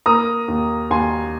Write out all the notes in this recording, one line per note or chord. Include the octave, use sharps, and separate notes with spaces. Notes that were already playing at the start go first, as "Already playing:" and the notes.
A#3 A#5 D#6
D#2
D#2 G#5 C6